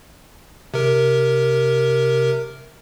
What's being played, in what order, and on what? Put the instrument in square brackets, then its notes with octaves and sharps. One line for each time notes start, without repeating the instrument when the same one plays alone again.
[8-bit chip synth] C3 A#4